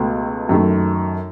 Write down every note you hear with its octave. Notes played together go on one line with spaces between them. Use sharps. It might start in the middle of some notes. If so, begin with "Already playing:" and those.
Already playing: C#2 B2 A3
F#2 D#3 A3